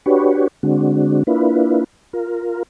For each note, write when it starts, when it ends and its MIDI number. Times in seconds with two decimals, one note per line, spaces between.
0.06 0.48 62
0.06 0.48 66
0.06 0.48 67
0.06 0.48 71
0.06 0.48 73
0.63 1.23 50
0.63 1.23 56
0.63 1.23 60
0.63 1.23 62
0.63 1.23 66
1.27 1.84 58
1.27 1.84 62
1.27 1.84 64
1.27 1.84 65
1.27 1.84 71
2.13 2.63 65
2.13 2.63 70